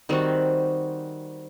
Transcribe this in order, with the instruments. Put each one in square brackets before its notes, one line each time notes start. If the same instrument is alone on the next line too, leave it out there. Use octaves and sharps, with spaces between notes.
[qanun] D#3 G3 C4 F#4